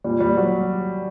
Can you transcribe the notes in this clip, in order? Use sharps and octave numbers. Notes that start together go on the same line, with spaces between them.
A#2 G3
G3
F#3